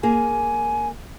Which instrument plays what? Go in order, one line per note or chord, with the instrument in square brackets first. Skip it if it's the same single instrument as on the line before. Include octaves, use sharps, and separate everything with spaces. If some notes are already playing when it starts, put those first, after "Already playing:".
[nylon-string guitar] A#3 G#4 [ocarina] G#5